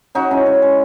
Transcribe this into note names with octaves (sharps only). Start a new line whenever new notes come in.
C#3 D#4 F#4
G#3 C#4 E4
C#3
G#3